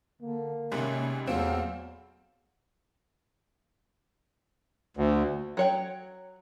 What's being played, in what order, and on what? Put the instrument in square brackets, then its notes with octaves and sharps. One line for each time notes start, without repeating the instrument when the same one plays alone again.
[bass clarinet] D3 [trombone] A#3
[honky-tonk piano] G#1 G#2 G3 [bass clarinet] C3 [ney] C#4
[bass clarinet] E2 [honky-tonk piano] A#2 A3 C4 [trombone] F#3 [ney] F5
[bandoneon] D2
[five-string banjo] F#3 C#5 G5